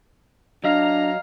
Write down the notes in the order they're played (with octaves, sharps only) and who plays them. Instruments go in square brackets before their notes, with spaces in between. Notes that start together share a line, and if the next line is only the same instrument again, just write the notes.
[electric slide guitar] F#3 D#5 [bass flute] D4 [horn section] F5 A#5